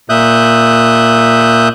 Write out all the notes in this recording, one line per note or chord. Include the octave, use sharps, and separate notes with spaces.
A#2 E5 D#6 F#6 G6